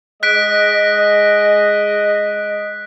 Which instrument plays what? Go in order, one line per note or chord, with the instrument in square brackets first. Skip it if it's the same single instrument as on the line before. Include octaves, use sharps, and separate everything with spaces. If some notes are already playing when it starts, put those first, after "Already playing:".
[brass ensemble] G#3 D#5 [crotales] F#6 B6 D7